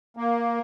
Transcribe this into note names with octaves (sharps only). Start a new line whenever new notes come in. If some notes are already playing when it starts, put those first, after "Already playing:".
A#3